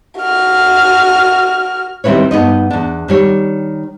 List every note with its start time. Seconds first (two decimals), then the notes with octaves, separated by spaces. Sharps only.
0.20 F#4 F6
2.04 D#3 G3 C4 E4 B4 C#5
2.31 G2 B3 D#4 D#5
2.70 E2 D4
3.08 D#3 G3 C#5